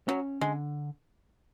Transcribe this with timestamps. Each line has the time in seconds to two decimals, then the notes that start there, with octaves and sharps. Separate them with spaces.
0.08 F#3 C#4
0.41 D3 G#3